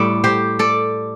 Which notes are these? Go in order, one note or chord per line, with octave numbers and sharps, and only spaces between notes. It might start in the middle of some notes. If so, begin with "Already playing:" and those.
Already playing: A2 G3 A4 D5
G4 C5
A4 D5